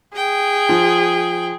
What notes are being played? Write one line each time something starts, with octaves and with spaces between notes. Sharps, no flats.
G#4 G5
F3